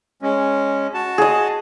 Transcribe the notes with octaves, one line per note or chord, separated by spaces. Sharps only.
G#3 C#4
F#4 A5
G#4 D#5